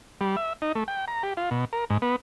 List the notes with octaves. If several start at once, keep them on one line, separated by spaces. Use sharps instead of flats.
G3
E5
D#4
A3
G5
A#5
G4
F4
B2
A#4
G#2
B3